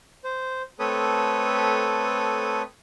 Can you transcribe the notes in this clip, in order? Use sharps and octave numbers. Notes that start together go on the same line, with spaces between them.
C5
A3 C4 A4 B4 C#5 D#6